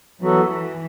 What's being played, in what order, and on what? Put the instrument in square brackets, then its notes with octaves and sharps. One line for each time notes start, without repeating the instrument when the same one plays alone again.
[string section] E3 [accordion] F#3 B3 F#4 A4
[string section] E3